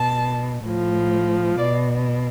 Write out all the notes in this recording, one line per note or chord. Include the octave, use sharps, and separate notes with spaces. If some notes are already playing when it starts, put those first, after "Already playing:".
Already playing: B2 A5
A2 F3
B2 D5